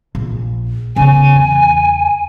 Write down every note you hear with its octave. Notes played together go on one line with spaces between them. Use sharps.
A#1
C#3 B3 G#5
E2